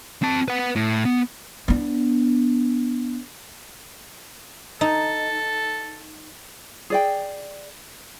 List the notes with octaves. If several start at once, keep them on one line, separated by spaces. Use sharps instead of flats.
C4 A5
B4 F#5
A2
B3
B3 D4
D#4 A4
G#4 D5 G5